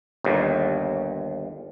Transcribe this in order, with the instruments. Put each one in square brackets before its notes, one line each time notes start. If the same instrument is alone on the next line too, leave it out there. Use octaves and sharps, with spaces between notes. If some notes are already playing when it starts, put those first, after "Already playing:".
[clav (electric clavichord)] G1 D#2